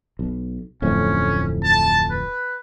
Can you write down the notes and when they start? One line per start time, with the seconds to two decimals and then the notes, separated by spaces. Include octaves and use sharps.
0.19 B1
0.82 D1 F2 A2 C#4
1.64 A5
2.10 B4